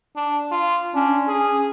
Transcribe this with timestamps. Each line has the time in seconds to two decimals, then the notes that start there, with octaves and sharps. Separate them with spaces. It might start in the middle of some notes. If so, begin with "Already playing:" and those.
0.16 D4
0.52 F4
0.94 C#4 D4
1.28 G#4